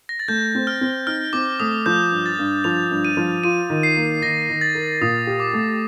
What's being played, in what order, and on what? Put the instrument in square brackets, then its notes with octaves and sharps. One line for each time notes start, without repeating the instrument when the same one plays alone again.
[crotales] A#6
A6
[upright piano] A3 [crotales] G6
[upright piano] C4
[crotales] F6
[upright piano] C4
[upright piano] D#4 [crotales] F6
[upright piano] C4 [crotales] D6
[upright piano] A3 [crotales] D#6
[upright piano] F3 [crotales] G6
[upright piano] G2
[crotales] A6
[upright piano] G2
[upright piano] F3 [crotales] F7
[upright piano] G2
[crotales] D#7
[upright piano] F3
[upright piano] F4 [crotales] D#7
[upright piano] D#3
[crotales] C7
[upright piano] A#3
[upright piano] D#3 [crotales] A#6
[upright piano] D#3
[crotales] A6
[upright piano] A#4
[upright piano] A#2 [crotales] D#6
[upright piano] G4
[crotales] D6
[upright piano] A3